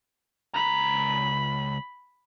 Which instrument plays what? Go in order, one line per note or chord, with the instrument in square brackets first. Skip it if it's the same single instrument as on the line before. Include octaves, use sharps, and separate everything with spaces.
[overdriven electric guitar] C#2 A#5 [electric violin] B5